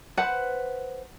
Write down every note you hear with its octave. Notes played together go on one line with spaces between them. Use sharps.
B4 C5 F#5